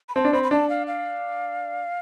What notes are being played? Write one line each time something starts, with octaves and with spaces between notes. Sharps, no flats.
B5
C4 A5
D4
C4 B5
B5
D4 A5
F5
F5